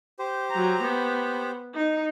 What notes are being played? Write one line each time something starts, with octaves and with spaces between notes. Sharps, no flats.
G4 C5
F#3 A#5
B3
D#4